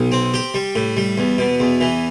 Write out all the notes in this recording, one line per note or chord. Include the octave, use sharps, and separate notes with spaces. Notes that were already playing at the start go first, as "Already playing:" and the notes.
Already playing: B1
C4
G4
G3
A2
G3
E2
B2
E2
E3